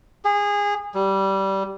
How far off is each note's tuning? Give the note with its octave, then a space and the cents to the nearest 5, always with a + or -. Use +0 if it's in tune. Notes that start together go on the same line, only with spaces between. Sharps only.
G#4 -25
G3 -15